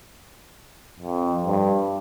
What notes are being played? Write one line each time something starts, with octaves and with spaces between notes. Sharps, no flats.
F2
G2